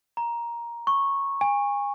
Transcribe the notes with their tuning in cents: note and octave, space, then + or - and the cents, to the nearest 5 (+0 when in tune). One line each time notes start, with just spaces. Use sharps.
A#5 +10
C#6 -10
G#5 -30